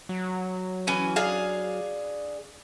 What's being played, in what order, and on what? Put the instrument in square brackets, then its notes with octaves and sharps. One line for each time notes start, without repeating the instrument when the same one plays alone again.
[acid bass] F#3
[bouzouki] E3 C#4 G#5
D4 G#4 F5